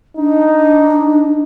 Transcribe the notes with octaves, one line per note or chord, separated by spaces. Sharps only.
D4 D#4